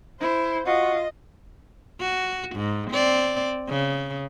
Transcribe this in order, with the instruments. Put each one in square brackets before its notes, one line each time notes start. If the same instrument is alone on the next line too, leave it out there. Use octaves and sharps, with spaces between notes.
[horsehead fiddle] E4 [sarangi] C5
[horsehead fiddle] F4 [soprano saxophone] F#4 [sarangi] D#5
[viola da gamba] F#4
G#2
C4 D5
C#3